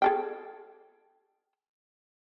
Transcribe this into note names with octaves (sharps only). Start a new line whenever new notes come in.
G#4 A4 G5